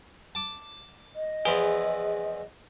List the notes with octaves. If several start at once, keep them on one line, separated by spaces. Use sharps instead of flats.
A5 D6
D#5
E2 E3 F3 G#4